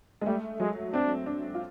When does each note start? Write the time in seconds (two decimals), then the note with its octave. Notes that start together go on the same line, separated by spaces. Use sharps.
0.21 G#3
0.26 G3 A3
0.60 F#3 G#3
0.93 C4 D4
1.26 D4
1.55 F4